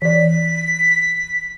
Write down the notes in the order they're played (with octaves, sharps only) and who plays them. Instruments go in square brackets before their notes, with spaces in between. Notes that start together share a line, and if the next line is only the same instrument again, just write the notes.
[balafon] E3 D5 [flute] B6